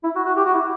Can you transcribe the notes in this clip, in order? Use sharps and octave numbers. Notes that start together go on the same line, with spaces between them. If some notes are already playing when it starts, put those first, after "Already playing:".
E4
F#4
F#4
G4
F#4
E4